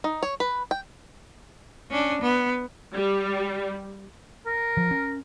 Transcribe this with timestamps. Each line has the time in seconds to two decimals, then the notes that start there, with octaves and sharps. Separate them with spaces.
0.04 D#4
0.23 C#5
0.40 B4
0.71 G5
1.91 C#4 D4
2.22 B3
2.95 G3
4.46 A#4
4.77 F3
4.91 C#4